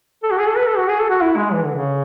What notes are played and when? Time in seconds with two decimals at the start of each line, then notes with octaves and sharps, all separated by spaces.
0.23 A4
0.31 F#4
0.39 G#4
0.48 A4
0.56 B4
0.67 A4
0.77 F#4
0.88 G#4
0.99 A4
1.10 F#4
1.21 E4
1.36 G#3
1.53 E3
1.64 D3
1.75 C#3